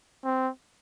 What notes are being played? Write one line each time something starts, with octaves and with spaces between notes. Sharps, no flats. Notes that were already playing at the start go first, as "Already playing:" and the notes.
C4